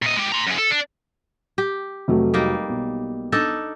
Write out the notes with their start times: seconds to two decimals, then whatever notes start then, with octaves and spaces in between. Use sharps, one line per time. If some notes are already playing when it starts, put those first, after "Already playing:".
0.02 A#2 D#5
0.16 G#3 G4
0.32 A#5 C6
0.47 F#2 G#4
0.58 A4
0.71 D4
1.58 G4
2.08 F1 F#3 A3
2.34 G3 A#3 D#4
2.69 B1
3.32 D4 D#4 A4